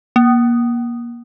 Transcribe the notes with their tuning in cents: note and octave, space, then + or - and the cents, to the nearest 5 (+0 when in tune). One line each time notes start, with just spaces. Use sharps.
A#3 +30